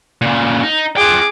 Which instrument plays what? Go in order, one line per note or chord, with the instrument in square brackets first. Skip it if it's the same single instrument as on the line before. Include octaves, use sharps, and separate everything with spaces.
[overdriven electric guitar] A#2 C#3
D#4
[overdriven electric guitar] F4 G5 [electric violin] G#4 D6